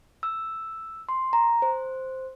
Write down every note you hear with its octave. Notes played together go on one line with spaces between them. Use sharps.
E6
C6
A#5
C5